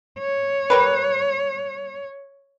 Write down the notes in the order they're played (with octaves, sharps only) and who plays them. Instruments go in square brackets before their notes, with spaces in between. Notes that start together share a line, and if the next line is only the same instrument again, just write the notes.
[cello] C#5
[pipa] G3 A#4 B4